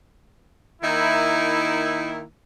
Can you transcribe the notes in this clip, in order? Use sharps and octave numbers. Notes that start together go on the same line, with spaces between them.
D#3 A#3 D#4 E4